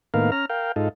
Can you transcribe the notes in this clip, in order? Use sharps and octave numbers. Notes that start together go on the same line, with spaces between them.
A2 D#3 A#3 B3 A#4 F5
C#4 A#5 F6
A#4 F5 G5
G#2 D#4 F4 A4